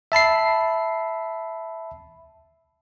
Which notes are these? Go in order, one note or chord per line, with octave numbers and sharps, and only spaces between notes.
E5 A5 B5 C7